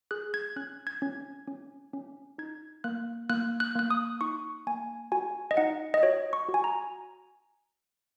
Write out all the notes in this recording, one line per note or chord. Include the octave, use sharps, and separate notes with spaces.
G#4 F#6
G#6
C#4 F#6
G#6
C#4
C#4
C#4
D#4 G#6
A#3 F#6
A#3 F#6
F#6
A#3 F#6
D#6
D#4 C#6
A#3 G#5
F#4 G#5
D#5
D#4 F#5
D#5
F#4 C#5
C#6
F#4
G#5
A#5